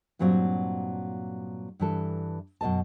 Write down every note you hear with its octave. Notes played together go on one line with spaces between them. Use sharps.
G2 A#2 F#3 C4 F#4 F5
G2 E3 A4
F#2 B2 D#5 A5